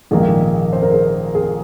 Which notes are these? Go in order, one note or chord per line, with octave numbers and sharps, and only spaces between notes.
A#1 G#2 D#3 A#3 G#4
C5
A#4
G#4
G#4